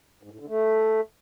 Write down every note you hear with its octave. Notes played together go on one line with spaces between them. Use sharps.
G#2
A2
D3
A3